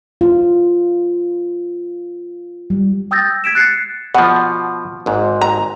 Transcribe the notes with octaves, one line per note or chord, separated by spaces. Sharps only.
F4
G3
G5 D#6 E6 G6 A6 A#6
G#6 B6 D7 E7
F#6 G#6 A6 C7 C#7
B2 F3 F#5
G#1 G#2
A#5